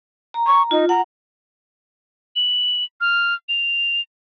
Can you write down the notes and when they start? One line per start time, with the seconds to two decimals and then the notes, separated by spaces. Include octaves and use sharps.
0.34 A#5
0.47 C#6
0.71 D#4 F4
0.89 F#5 A#5
2.36 F#7
3.01 F6
3.49 F7